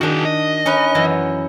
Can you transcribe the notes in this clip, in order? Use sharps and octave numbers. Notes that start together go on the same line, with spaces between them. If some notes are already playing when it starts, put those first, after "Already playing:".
D#3 D4 F#4 G#4
D#5
C#4 D#4 B4
F#2 E3